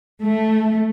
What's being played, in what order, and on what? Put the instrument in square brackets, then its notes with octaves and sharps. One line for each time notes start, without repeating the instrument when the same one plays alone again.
[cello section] A3